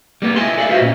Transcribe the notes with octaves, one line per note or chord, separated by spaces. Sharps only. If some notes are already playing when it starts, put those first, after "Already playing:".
G3 A#3 B3
E4 F4 D#5 G#5 A5 C6
A4 D5 E5 F5
F4 F#4 B4 C5 D#5 E5
A#2 C#4